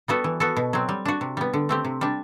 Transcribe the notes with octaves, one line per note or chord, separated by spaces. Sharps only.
G3 B3 F#4 A4
E3
B3 F#4 A4
B2
F#3 C4
G3
D4 F#4
C3
G3 B3
D3
A3 C4 G4
C3
G3 D4